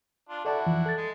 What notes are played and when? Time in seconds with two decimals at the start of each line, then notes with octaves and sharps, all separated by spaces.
0.29 D4 F4
0.45 D4 E4 F#4 A4 D5 A5
0.66 F2 E3 F3
0.86 A4 A6
0.97 G#3